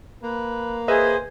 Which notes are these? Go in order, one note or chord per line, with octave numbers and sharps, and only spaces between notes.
A#3 B4
G#4 B4 C5 D#5 E5